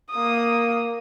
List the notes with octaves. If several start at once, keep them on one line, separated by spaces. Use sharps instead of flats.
A#3 D#6